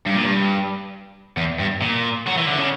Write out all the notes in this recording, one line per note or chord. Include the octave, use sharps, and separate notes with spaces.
G2
A#2
G2
E2
G2
A#2
F#3
E3
D3
C#3